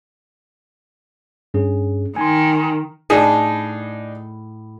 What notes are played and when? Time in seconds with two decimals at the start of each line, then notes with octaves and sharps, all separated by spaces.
1.54 G2 C#4 G#4
2.16 D#3 G#5 C6
3.10 A2 D4 D#4 G#4